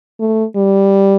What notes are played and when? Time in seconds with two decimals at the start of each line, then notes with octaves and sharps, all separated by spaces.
0.20 A3
0.56 G3